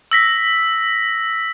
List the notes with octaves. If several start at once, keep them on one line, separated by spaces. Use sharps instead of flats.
E6 A#6 B6